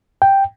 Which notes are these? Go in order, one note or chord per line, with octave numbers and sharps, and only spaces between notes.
G5